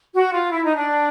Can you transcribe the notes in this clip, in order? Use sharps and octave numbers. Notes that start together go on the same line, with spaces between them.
F#4
F4
E4
D#4
D4